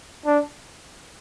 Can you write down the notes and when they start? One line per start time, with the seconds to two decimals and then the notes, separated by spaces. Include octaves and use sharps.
0.26 D4